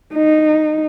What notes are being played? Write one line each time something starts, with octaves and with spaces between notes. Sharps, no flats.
D#4